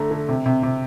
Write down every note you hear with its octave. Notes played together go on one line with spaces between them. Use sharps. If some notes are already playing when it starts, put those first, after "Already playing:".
Already playing: D3 A3 A#5
D3
C3
C3
C3